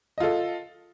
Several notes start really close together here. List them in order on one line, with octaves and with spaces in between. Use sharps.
D#5 F4 A4